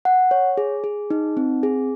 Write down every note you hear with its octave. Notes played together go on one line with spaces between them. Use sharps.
F#5
C#5
G#4
G#4
D#4
C4
G#4